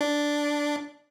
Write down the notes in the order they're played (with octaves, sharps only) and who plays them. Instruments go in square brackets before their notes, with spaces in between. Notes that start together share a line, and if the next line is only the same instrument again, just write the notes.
[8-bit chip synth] D4